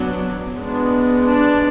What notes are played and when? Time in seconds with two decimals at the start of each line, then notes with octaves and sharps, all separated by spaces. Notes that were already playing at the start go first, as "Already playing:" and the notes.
Already playing: F#3 B3 D4
0.57 G#3 B3 D4
1.25 D4